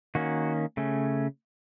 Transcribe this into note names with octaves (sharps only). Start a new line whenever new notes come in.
D#3 A#3 C#4 F#4
C#3 A3 C#4